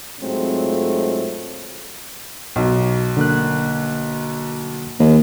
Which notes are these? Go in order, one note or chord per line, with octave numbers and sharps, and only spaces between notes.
G#2 F#3 G#3 A3 C4 F4
B1
D3 A#3 F#6
D#2